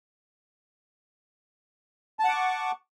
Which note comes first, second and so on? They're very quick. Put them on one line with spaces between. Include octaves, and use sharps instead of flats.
A5 F#5 D6 C#6